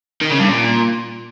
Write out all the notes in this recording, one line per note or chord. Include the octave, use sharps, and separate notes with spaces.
D#3
C#3
G2
A#2